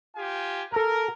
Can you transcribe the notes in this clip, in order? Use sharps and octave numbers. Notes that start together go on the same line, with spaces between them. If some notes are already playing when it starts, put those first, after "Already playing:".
F4 G4 G#5
A4 A#4 A#5